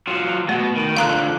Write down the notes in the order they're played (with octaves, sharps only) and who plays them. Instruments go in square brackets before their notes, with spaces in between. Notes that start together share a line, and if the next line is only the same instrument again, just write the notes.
[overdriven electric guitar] F#3 F4
[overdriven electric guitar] B2 [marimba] A3
[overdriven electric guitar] D#3
[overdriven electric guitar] F2 D3 [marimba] F5 A#5 F#6